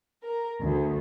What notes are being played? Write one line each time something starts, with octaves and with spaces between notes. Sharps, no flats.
A#4
D2